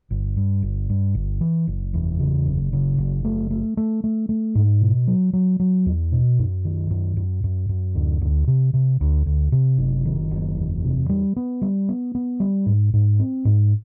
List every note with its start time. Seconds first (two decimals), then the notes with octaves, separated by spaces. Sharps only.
0.10 G1
0.37 G2
0.63 G1
0.90 G2
1.15 G1
1.41 E3
1.67 F#1
1.94 E2
2.19 C#3
2.46 F#1
2.73 C#3
2.98 F#1
3.25 A3
3.51 A3
3.77 A3
4.04 A3
4.29 A3
4.55 G#2
4.81 B2
5.08 F#3
5.33 F#3
5.60 F#3
5.86 E2
6.12 B2
6.39 F#2
6.65 D#3
6.90 F#2
7.17 F#2
7.44 F#2
7.69 F#2
7.95 D2
8.21 D2
8.47 C3
8.74 C3
9.01 D2
9.26 D2
9.52 C3
9.78 F#1
10.05 D#3
10.31 F#1
10.57 E2
10.84 C3
11.09 G3
11.36 B3
11.62 G3
11.89 B3
12.15 B3
12.40 G3
12.66 G#2
12.93 G#2
13.20 C4
13.45 G#2